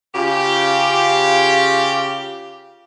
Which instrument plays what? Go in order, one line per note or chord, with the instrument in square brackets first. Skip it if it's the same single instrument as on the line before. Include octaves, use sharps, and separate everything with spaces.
[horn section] C#3 F4 G4